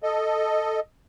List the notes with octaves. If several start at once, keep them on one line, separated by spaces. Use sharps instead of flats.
A4 D#5